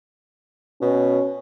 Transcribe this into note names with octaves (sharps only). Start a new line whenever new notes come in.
B2 C#4